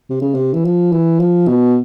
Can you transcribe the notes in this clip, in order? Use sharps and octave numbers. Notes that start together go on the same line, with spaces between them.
C3
C#3
C3
E3
F3
E3
F3
B2